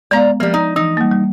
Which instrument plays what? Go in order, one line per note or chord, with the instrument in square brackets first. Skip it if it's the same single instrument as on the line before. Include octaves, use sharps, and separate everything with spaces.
[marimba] G#3 B3 F5 [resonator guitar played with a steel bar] D5 A#5
[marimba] F3 [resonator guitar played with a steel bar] G3 A#3
[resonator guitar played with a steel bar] D#4 [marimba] A#5
[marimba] E3 [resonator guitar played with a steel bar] D#4
[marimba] G3 A#3
G3